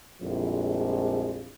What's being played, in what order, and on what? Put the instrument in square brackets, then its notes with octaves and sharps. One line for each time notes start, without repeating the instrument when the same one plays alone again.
[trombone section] A#1 F2 F3 G3 G#3 E4